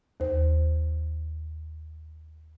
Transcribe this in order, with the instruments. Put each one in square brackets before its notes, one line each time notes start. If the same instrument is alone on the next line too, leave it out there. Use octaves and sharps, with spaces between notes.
[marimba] D#2 C5